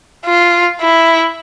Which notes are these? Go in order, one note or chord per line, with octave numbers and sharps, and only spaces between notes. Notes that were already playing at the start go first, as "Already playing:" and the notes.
F4
E4